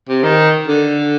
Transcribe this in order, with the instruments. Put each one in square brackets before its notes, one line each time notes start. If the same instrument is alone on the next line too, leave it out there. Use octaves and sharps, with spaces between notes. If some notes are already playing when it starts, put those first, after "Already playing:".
[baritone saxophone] C3
D#3
D3